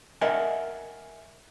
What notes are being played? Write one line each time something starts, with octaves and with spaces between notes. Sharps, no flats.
A#4 D#5 E5 F#5 G#5